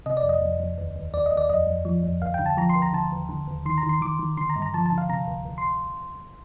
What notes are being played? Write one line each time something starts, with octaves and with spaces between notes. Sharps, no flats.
C3 D#5
D5
F2
D#5
F2
F2
D#2
D#2
D#2 D5
D#5
D#2
D5
F2 D#5
F2
F3
F2
D2 F5
D3 G5
A5
F3 A#5
C6
D2
A#5
D3 A5
D#2
D3
D#2
D#3 C6
A#5
D#3
C6
D#3 D6
D#3
D3 C6
A#5
G2
A#5
F3 A5
A5
D3
F5
C3 A#5
D2
D2
C6